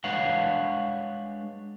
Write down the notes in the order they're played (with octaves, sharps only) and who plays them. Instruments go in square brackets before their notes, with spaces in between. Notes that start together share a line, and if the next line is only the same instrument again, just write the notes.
[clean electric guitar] G#3 D4 B4 C#5 F5 F#5